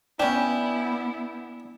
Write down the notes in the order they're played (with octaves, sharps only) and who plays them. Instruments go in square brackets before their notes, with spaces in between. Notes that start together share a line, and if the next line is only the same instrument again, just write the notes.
[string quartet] B3 E4 [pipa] C#4 G4 [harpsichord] D4